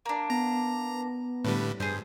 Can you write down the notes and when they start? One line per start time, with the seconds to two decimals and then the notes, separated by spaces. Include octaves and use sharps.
0.05 A#3 D4 A#5
0.30 B3 A#5
1.44 A2 D3 G3 B4
1.80 G2 G#4 C5